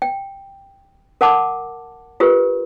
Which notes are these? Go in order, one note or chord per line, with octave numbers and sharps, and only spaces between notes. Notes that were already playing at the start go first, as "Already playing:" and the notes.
G5
A#4 F#5 A5 D6
F4 G4 A#4 B4